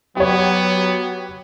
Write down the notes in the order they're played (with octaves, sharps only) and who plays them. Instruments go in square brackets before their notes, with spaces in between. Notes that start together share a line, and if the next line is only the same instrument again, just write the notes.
[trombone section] F#3 [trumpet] B3 [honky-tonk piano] G4 C#5